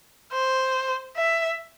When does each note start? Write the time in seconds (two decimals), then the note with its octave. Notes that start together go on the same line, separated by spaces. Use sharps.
0.32 C5
1.16 E5